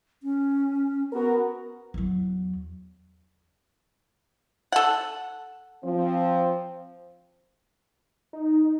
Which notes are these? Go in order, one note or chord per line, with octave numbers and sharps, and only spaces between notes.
C#4
B3 F#4 A#4
E2 F#3
A4 F#5
F3 C4
D#4